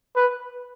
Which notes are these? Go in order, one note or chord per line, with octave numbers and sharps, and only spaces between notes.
B4